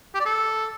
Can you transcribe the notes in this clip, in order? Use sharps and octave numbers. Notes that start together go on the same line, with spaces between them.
G4
D5
A4